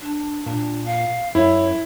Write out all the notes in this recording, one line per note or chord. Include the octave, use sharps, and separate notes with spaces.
D4
A#2 D4
F5
F#2 E4 C#5